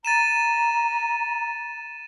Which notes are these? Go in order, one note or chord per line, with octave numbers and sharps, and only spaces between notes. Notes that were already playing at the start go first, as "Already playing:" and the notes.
A#5 A6 D#7 E7